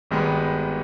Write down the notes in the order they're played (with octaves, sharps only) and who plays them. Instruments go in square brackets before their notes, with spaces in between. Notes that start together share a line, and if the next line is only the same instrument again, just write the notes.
[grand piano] G#1 G2 D#3 G#3 B3